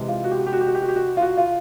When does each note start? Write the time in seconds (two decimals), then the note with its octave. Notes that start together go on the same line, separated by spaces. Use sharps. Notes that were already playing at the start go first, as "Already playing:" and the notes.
Already playing: C3 E3 G#3
0.08 F4
0.24 F#4
0.31 G4
0.39 F#4
0.47 G4
0.53 F#4
0.61 G4
0.67 F#4
0.75 G4
0.82 F#4
0.89 G4
0.96 F#4
1.17 F4
1.22 F#4
1.37 F4